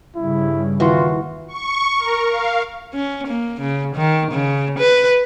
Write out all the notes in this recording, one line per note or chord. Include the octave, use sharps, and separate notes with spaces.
G2 C#3 E4
D#2 E3 F4 F#4 C6
C#6
A#4
F5
C#4
A#3
C#3
D#3
C#3
B4